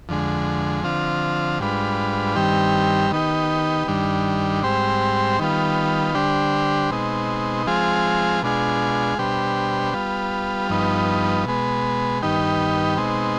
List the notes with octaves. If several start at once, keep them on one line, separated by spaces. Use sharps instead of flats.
F2 D3 G#3
D3 F3 C4 F4
G#2 G3 D4 F4 B4
G2 D#3 G3 C4 G4
D#3 B3 D#4 G4
G2 D#3 G3 D4
G#2 G3 C4 G4 C5
D#3 G3 B3 F4
D3 G3 D4 G4 C5
B2 G#3 C4 D#4
F3 G#3 C4 F4 G#4
B2 G#3 D4 F4 G#4
B2 G3 D4 G4 C5
G3 B3 F4
G2 F3 B3 D#4
B2 G#3 B3
G2 D#3 B3 D#4 G4
B2 G#3 C4 D#4